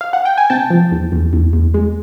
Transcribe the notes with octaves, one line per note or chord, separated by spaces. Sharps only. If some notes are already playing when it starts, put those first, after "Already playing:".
F5
F#5
G5
G#5
C3 G5 A5
F3
E2
E2
E2
E2
G#3